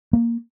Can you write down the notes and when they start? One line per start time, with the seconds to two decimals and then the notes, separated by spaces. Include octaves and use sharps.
0.13 A#3